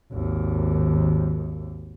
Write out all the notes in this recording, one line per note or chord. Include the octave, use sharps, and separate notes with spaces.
G#1 D#2